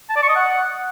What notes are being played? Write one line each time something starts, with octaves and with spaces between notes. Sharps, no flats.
A5
D5
C#6
D#5
F#5